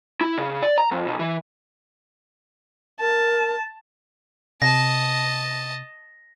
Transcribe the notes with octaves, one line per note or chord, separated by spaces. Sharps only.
E4
C#3
D5
A#5
F2
B1
E3
A#4 A5
C3 D#5 A5 A#6